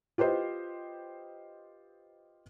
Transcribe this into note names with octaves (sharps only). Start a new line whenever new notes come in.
F4 G4 B4 C5 D#5